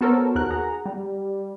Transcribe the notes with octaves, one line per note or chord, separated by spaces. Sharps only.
B3 F#4 A4 A#4 C5 C#5
D#2 F#4 A#4 F#6
G#4 F#5 A#5
G3